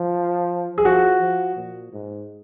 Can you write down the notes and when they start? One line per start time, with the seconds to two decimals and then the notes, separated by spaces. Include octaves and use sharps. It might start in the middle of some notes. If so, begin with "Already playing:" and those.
Already playing: F3
0.78 G#4
0.84 F3 F#4
1.20 F3
1.56 A#2
1.92 G#2